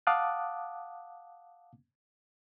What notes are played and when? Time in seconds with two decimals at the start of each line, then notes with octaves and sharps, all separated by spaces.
0.07 F5 F#5 A5 D6 D#6 F#6